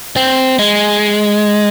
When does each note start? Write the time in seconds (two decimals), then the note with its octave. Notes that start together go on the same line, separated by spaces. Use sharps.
0.16 C4
0.59 G#3